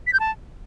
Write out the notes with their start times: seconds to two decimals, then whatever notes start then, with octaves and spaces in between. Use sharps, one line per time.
0.07 B6
0.13 G6
0.20 A5